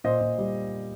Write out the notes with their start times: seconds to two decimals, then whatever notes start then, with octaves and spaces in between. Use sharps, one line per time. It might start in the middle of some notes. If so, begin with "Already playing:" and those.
0.04 A#2 C5 D#5
0.21 A#2
0.38 G3